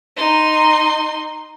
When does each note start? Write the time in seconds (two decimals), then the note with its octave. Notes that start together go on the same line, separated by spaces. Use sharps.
0.16 D#4 C6